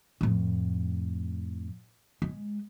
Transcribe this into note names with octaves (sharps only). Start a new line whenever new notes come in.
F2 A2
G#3